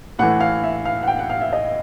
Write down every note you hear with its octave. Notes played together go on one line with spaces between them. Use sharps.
A2 E3 F#5
F5
E5
F5
F#5
G5
F#5
F5
E5
D#5